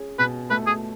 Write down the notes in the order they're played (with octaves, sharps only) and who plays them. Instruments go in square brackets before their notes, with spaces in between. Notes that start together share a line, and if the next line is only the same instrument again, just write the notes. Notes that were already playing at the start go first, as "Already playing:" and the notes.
Already playing: [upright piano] C#4 G#4
[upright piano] B2 [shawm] B4
[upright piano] A3 [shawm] B4
[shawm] G#4